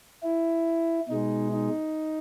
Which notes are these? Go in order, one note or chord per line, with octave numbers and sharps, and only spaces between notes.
E4
B2 G#3 D#4
D#4